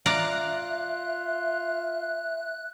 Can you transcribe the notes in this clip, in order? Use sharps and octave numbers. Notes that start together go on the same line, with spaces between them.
F4 D5 E5 F5 A#5 F#6